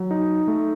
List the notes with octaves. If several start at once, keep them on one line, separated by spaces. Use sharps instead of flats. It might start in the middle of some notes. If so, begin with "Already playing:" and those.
Already playing: F#3
D#4
A3